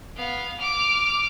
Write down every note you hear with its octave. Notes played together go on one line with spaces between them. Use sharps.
B3 F5
D6 F6